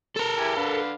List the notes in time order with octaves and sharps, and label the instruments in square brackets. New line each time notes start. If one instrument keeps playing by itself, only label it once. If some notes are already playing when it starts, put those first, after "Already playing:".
[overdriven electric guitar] A4 A#4
[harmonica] E4 G4 G#5
D3 B4 F5